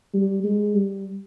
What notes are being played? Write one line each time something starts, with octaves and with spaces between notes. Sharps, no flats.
G3
G#3
G3